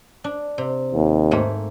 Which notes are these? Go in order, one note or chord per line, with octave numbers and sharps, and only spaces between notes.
D4
C3
D#2
G#2 A3 A#3